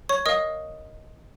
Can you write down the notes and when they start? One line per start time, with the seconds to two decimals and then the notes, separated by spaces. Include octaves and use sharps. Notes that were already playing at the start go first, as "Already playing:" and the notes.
0.09 C#5 C#6
0.26 A#4 D#5 F5 D#6